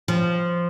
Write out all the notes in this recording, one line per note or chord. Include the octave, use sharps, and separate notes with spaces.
F3